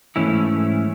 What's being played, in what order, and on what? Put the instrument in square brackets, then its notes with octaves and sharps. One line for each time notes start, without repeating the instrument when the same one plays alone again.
[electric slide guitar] G#2 E3 A3 C#4 E4